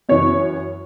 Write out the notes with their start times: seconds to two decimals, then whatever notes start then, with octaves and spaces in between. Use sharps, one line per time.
0.09 F#2 E3 C#5